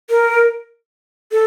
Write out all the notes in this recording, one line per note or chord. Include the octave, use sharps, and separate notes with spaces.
A#4
A4